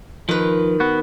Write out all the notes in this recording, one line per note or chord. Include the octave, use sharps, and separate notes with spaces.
D#3 F3 B4
B3 F#4